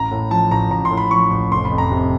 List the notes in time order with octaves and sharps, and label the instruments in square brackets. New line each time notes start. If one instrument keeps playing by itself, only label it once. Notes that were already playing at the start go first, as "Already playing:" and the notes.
Already playing: [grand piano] A1 A#5
A2
F3 A5
A1 A#5
A1 A#5
C6
A2
B5
F3 C#6
A1
F1 C6
B5
F2
A#5
C3